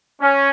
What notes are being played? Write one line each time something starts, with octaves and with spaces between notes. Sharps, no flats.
C#4